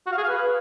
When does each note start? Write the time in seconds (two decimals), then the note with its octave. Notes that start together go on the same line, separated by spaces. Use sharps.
0.07 F#4
0.12 F5
0.17 G#4
0.23 F5
0.28 B4